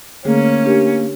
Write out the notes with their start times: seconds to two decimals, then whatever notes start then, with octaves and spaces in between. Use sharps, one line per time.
0.25 D3 A3 A#3 C#4 G#4
0.65 D4 G4 A#4